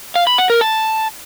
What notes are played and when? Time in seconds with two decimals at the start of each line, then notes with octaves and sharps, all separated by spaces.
0.15 F5
0.27 B5
0.38 F#5
0.50 A#4
0.61 A5